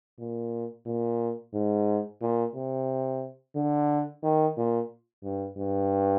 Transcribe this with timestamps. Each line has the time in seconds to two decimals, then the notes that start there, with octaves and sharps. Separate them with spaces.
0.19 A#2
0.86 A#2
1.54 G#2
2.21 A#2
2.55 C3
3.56 D3
4.23 D#3
4.57 A#2
5.24 G2
5.58 G2